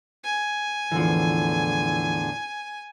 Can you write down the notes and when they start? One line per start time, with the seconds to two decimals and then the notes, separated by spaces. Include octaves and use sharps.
0.24 G#5
0.92 E2 A2 D3 E3 F3